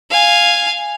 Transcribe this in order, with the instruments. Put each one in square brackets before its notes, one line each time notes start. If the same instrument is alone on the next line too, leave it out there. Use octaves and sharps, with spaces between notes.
[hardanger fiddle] F5 G#5